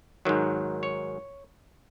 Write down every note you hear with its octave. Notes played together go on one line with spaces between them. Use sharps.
G#2 D#3 F#3
C#5